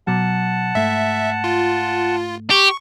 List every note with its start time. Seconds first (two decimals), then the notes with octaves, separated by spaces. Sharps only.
0.07 B2 F#3 F#5 A5
0.75 G#2 A3 E5
1.44 F4
2.51 G4 C#6